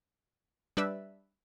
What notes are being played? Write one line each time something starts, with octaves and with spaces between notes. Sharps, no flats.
G3 D4 B4 D5 E5